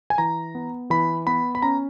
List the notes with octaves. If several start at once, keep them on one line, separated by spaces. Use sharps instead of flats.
G#5
E3 A#5
B3
E3 B5
B3 B5
B5
C#4 A#5